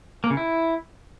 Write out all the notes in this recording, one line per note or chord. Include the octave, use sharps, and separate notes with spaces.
A#3
C#3
E4